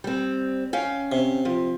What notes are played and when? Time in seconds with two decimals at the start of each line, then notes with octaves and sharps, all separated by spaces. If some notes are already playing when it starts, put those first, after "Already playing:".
0.04 G3 C4
0.73 C#4 F5 G5
1.12 C3
1.45 F3